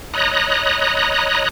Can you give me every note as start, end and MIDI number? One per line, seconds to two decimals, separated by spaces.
0.14 1.49 73
0.14 1.49 75
0.14 1.49 82
0.14 1.49 83
0.14 1.49 87
0.14 1.49 90